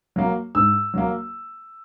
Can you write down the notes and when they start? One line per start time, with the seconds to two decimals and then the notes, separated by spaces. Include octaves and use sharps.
0.16 F#3 A#3
0.55 G#2 E6
0.94 F#3 A#3